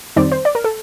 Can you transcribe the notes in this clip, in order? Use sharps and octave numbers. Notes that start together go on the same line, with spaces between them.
F2 D#3 G3 C4 D#4 D5
C5
D5
A#4
A4